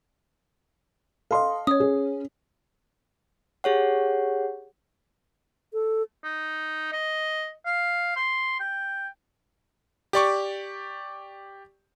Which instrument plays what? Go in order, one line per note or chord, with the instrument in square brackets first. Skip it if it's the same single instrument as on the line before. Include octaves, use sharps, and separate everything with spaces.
[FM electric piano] A4 D#5 [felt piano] F5 C6
[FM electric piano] C#4 [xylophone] C#5 D#6
[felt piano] G#4
[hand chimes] G4 G#4 C#5 F#5
[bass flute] A4
[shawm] D#4
D#5
F5
C6
G5
[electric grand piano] G4 D5 C#6